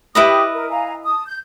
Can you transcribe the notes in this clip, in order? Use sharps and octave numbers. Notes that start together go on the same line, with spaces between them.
E4 G4 B4 D#5 D6 D#6
A#4
F5 G#5 A#5
A5 D#6
G6